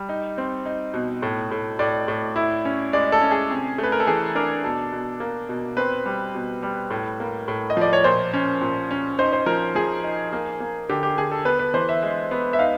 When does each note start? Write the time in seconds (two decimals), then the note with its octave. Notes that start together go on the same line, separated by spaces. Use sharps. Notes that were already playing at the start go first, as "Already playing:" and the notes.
Already playing: G3
0.09 D#4
0.38 C4
0.66 D#4
0.94 B2
1.22 A2
1.51 A2
1.79 A2 D5
2.08 A2
2.36 E4
2.65 C#4
2.93 G#3 D5
3.12 A4
3.21 C#4
3.31 G#4
3.50 C3
3.78 A3
3.83 B4
3.92 A#4
4.00 A4
4.07 E3 G#4
4.35 D4 A#4
4.64 B2 A4
4.92 B2
5.20 A#3
5.49 B2
5.77 C4 B4
6.06 G3
6.35 B2
6.62 G3
6.90 A2
7.20 A#3
7.48 A2
7.70 D#5
7.77 F3 D5
7.93 C#5
8.04 A#2 C5
8.33 C#4
8.61 A#2
8.91 C#4
9.19 D#4 C5
9.33 C5
9.46 F3 A#4
9.75 F3 G#4
10.04 D#4
10.33 A#3
10.60 A#3
10.89 D3 G4
11.03 G4
11.18 D3 G#4
11.32 A4
11.45 B3 B4
11.59 B4
11.74 E3 C5
11.89 E5
12.02 G#3
12.31 B3
12.53 E5
12.59 D#4 F5